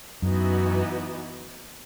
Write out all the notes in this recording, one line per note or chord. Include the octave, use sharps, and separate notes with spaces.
F#2 E3 B3 D#4 F#4